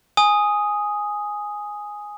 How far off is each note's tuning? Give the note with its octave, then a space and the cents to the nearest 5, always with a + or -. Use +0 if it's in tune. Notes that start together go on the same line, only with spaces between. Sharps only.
G#5 +0 D#6 +0